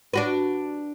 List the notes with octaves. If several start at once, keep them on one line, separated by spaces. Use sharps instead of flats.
D4 F#4 B4